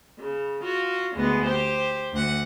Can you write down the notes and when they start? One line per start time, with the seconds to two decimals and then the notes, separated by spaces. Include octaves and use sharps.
0.18 C#3
0.63 F4 F#4
1.15 D2 G#3 B3
1.45 G4 C5
2.12 D2 F#5